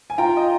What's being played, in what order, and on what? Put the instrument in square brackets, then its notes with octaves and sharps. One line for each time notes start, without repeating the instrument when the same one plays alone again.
[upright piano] G#5
[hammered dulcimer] F4 [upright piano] G5 A#5
[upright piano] D#5